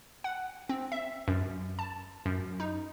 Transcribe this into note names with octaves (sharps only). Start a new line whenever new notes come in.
F#5
C4
E5
F#2
A5
F#2
D#4